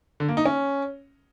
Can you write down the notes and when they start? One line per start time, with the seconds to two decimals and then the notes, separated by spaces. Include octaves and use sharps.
0.20 D3
0.28 A#3
0.37 D#4
0.45 C#4